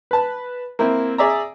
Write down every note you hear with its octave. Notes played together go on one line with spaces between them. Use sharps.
B4 A5
A#3 C4 E4
G#4 D5 E5 A#5